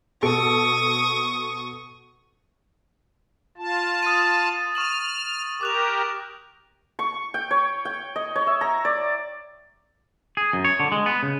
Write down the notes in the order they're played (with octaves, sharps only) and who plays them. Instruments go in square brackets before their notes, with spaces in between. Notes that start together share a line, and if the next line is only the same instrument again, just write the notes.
[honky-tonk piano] B2 A4 D7 [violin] C#6 D#6
[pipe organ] F4 A5
[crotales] D#6 A6 D#7
[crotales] C#6 E7 F#7 [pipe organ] F6
[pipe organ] G4 A#4 [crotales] D6 F#6 F7
[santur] C#6
G5
C#5
G5
D#5
C#5
E5
A#5
D5
[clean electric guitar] G#4
F#2
C#5
D3
G#3
B3
C#3